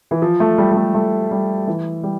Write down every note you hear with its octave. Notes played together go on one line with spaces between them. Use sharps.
E3
F3
A3
G3
G3
A3
A3
G3
E3
G3